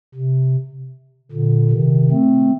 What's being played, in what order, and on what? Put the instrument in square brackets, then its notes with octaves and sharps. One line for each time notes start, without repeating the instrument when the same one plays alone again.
[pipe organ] C3
A#2 D3
C3 D#3
A3 C4